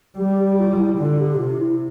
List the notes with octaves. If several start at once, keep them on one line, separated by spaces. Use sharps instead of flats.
G3 G4
G4
F4
F4
E4
D3 F4
G4
C3 F4
E4